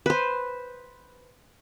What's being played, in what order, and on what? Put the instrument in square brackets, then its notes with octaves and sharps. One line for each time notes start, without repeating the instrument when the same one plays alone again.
[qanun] B4 C5